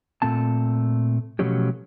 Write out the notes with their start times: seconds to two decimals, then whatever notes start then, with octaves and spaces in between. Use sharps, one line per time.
0.22 A#2 A3 C4 A5
1.39 B2 F3 F#3 A3 C#4 G4